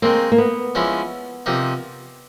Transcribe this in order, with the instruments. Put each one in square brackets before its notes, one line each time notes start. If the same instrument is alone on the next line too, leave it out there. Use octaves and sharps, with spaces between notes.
[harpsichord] D#3 G#3 C4 [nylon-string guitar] A#3
[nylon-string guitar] A#3
B3
[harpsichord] F3 G#3 C#4 E4
C3 F3 A#3 D#4